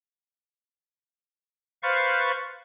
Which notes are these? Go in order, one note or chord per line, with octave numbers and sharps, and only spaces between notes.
B4 C5 F5 C#6 A6